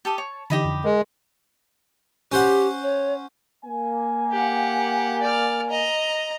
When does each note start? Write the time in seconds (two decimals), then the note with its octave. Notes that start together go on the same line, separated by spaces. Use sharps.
0.05 G4 A4 A5 D#6
0.18 C#5
0.50 D3 E3 D#4 G4 D#5 B5
0.64 F2 D3
0.84 G#3 A#4
2.32 C#4 G4 C5 F#5
2.82 C#5
3.65 A#3 G#5
4.31 G4 F#5
5.22 D5 F6
5.69 D#5 A#5